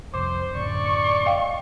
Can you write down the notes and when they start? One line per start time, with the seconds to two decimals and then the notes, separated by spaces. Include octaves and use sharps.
0.14 G1 C2 F2 C5 D6
0.56 F#2 A2 D3 D5 C#6
1.26 D#5 F5 G5